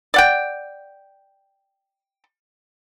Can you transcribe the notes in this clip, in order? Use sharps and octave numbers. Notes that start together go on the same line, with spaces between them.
D5 F#5 G5